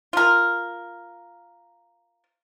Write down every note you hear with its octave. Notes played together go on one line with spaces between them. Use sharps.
F4 A#4